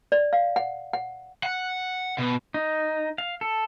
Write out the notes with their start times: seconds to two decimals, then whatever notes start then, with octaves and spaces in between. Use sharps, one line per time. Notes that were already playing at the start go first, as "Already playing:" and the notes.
0.12 D5
0.33 F5
0.56 F#5
0.93 F#5
1.43 F#5
2.18 B2
2.54 D#4
3.18 F5
3.41 A4